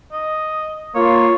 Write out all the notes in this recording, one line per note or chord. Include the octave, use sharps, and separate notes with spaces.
D#5
A#3 F4 C#5